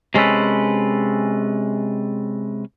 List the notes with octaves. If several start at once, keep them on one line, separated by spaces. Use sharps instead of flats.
C3 G#3 C#4 A4 B4